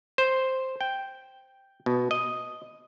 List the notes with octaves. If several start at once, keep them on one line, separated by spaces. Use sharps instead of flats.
C5
G5
B2
D#5